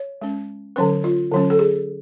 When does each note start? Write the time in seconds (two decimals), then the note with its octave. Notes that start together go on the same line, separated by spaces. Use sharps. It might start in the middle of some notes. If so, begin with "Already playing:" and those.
Already playing: C#5
0.21 G#3 C#4
0.76 D3 F#3 C#4 B4
1.04 F4
1.31 D3 F#3 C#4
1.50 A4
1.59 G#4